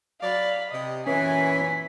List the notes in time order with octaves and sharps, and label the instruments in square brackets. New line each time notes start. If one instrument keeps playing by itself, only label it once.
[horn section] F#3 D5 [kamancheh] F5 B5
[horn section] C3 [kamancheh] D#5
[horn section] F#2 A#2 E3 [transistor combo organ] C#4 [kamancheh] G#5 [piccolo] B6